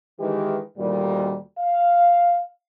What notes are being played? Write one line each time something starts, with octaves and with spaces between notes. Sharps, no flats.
D#3 E3 G#3 G4
D2 A#2 D#3 G3
F5